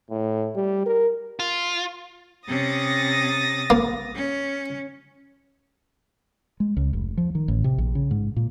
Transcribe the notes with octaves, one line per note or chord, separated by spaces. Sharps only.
A2
G3
A#4
F4
C3 C#4 D#6 A6 A#6
A#3
C#4
G#3
C#2
F1
F3
D#3
A1
C3
A#1
C#3
G#2
A#2